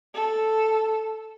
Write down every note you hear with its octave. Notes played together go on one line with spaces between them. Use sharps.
A4